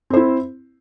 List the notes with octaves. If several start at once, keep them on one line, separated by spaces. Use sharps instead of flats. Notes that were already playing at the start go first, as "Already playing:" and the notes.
C4 E4 C5